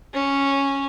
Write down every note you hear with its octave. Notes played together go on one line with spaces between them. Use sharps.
C#4